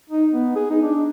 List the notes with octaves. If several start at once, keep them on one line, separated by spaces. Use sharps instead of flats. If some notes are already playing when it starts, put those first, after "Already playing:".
D#4
B3
G#4
D#4
D4